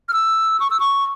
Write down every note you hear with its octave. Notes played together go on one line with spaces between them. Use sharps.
F6
E6
C#6
E6
C#6